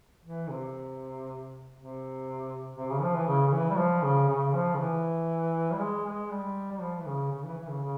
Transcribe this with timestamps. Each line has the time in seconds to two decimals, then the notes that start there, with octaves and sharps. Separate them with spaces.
0.24 E3
0.49 C3
1.76 C3
2.77 C3
2.90 C#3
3.02 F3
3.15 E3
3.27 C#3
3.48 C#3
3.52 E3
3.70 G3
3.78 F3
4.03 C#3
4.28 C#3
4.54 F3
4.74 C#3
4.79 E3
5.73 G3
5.80 G#3
6.05 G#3
6.31 G3
6.72 G3
6.81 F3
6.99 E3
7.06 C#3
7.32 C#3
7.45 E3
7.57 E3
7.69 C#3
7.83 C#3